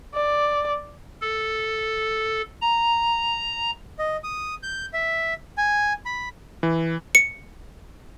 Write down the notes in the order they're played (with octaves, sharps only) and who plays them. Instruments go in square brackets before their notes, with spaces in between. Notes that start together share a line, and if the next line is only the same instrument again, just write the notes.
[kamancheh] D5
[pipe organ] A4
A#5
[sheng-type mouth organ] D#5
D#6
G6
E5
G#5
B5
[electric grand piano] E3
[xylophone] C#7